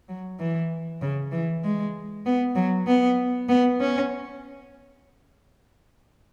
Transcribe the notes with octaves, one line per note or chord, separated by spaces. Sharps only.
F#3
E3
C#3
E3
G#3
B3
F#3
B3
B3
C#4